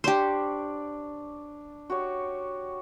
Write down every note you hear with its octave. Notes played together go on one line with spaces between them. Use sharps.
D4 G4 C5 D5 C#6
F#4 G4 C#5